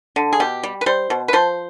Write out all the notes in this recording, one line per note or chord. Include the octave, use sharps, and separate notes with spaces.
D3
G#4
B2 G4
G3
B4
G3 C5
B2
B4
F3 C5